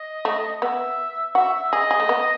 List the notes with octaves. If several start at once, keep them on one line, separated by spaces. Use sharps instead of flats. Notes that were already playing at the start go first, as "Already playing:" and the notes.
Already playing: D#5
A3
B3 E5
F#4 E5
E5
G#4 D#5
G#4
A3
B3